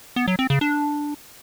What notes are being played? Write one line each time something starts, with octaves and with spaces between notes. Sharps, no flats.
B3
F#3
C4
C#3
D4